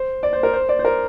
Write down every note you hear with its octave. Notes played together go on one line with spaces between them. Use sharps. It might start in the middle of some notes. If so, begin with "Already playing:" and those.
Already playing: C5
D5
C5
A#4
C5
D5
C5
A#4